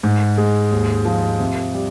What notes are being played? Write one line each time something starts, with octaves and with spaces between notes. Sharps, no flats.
G#2
G#3
D#2
F3
C3
G3